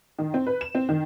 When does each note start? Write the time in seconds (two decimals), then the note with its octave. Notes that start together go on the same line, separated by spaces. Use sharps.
0.18 D#3
0.34 C4
0.46 B4
0.61 E7
0.75 C4
0.89 D#3